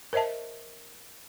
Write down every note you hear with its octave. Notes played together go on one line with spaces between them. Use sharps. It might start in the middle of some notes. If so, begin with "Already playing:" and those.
A#4 C5 D#5 E5 A5